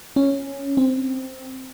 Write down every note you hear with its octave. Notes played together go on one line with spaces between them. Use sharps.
C#4
C4